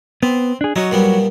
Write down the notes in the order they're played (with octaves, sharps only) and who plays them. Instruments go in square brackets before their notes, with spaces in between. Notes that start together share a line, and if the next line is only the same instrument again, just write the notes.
[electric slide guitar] B3 [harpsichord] C4
[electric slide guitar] D4 G#4
[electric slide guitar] F#3 F#4 [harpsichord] C#4 D#4
[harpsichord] A#2 G3 B3